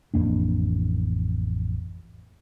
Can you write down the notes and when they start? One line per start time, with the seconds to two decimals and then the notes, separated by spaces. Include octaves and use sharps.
0.14 A1 F2 A#3 D4